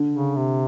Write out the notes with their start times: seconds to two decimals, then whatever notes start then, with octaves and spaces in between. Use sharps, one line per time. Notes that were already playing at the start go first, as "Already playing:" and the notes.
Already playing: D3
0.13 C#3
0.36 C3